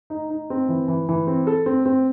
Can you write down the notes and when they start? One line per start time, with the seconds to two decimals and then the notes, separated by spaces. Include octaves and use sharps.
0.10 D#4
0.30 D#4
0.50 C4
0.69 E3
0.88 E3
1.09 E3
1.27 C4
1.47 A4
1.66 C4
1.86 C4